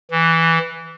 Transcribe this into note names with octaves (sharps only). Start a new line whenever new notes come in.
E3